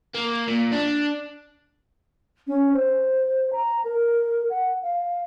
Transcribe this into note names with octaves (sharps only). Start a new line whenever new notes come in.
A#3
A#2
D4
C#4
C5
A#5
A#4
F#5
F5